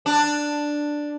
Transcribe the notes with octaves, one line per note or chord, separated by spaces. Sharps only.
D4